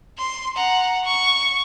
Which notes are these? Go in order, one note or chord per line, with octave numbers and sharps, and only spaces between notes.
C6
F#5 A#5
C#6